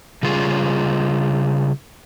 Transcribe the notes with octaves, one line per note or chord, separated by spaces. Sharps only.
C#3 G3 F4 G#4